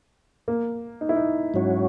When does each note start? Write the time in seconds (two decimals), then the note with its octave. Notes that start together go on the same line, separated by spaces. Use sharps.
0.48 A#3
1.01 D#4
1.09 E4
1.16 D#4
1.54 G#2 F#3 C#4 F#4